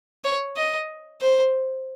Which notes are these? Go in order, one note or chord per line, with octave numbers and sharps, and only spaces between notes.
C#5
D#5
C5